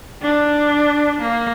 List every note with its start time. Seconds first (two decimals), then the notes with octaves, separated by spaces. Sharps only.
0.22 D4
1.21 A#3